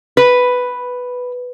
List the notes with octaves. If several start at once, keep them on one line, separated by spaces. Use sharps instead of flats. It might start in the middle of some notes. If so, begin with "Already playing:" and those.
B4